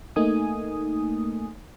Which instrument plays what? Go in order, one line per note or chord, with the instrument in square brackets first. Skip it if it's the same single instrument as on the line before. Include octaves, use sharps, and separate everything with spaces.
[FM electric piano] A3 A#3 D#4 G#5 D#6